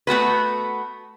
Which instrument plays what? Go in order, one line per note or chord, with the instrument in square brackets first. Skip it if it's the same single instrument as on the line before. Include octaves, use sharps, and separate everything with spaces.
[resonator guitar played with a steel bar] A3 B3 F#4 B4